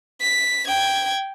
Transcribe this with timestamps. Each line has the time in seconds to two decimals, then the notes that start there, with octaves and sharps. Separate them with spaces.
0.21 B6
0.68 G5 G#6